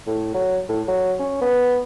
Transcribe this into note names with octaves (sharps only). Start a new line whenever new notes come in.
A2
F#3
A2
F#3
C#4
B3